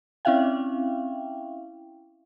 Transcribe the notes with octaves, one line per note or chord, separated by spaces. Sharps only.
C4 C#4 E4 E5 F5 G5